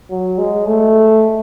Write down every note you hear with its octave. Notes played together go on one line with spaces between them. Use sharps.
F#3
G#3
A3